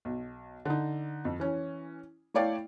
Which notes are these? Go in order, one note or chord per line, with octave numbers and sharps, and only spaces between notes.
B1
D3 D#4
F2
E3 C#4
A3 E4 C#5 D5 F5 G5